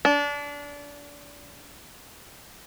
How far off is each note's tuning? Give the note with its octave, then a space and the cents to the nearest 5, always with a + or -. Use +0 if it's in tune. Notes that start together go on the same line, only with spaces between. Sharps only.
D4 -25